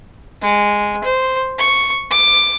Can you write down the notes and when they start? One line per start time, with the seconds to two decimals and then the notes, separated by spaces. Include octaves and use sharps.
0.42 G#3
1.04 C5
1.59 C#6
2.11 D6